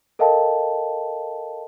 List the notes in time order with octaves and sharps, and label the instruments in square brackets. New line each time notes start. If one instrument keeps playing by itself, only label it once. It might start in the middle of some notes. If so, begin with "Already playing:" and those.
[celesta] A4 A#4 D#5 F5 G5 A5